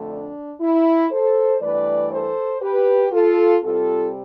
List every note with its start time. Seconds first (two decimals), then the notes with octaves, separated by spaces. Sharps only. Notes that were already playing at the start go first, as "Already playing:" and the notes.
Already playing: F2 D3 A3
0.10 D4
0.61 E4
1.11 A4 C5
1.61 G2 E3 A3 B4 D5
2.12 A4 C5
2.62 G4 B4
3.12 F4 A4
3.62 C3 G3 C4 F4 A4